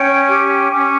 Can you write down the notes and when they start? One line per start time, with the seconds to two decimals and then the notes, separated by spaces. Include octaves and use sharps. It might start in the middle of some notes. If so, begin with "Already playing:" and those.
Already playing: C#4 C#5 G5
0.26 G4
0.72 C#4